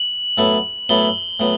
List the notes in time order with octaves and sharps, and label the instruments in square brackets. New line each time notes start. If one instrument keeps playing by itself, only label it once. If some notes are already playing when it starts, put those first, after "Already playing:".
Already playing: [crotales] F#7
[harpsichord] A2 F#3 B3 E4 A4
[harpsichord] A2 F#3 B3 E4 A4 [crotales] G7
[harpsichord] A2 F#3 B3